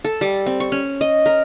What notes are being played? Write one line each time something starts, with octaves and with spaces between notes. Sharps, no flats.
A4
G3
C4
C#6
C#4
D#5
A#4